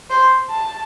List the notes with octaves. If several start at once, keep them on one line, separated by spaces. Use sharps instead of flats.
C5
A5